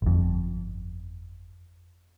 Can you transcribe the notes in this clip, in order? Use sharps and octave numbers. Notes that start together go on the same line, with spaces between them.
G1 F2